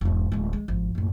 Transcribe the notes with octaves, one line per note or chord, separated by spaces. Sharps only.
E1 G#2
D1 G#3
G#3
G#1 F3
F#1 A2